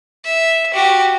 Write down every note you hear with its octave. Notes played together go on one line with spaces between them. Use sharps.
E5
F#4 G4